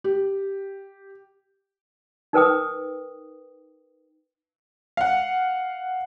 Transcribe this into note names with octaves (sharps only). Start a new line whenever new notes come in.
G4
D#4 A#4 B4 G5 D#6
F5 F#5